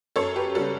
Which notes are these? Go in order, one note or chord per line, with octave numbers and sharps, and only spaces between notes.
F#2 A4 C#5
G4 B4
C#3 G3 F#4 A4